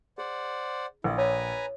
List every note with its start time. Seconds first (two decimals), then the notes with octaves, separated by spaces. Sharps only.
0.18 G#4 C5 D5 F#5
1.04 A#1 E4
1.18 B4 C#5 G#5 A#5